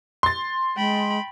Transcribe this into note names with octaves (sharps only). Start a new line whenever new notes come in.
C6 A6
G#3 G5 B5